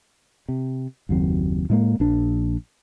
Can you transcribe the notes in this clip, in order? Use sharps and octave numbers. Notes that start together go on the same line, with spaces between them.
C3
F#1 D#2 F#3 C4
A2 G#3 A#3
A#1 D4